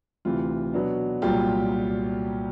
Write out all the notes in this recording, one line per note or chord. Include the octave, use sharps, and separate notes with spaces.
D2 C3 E3 F4
B2 F#3 B3 D4
C2 A#2 F#3 F4 G4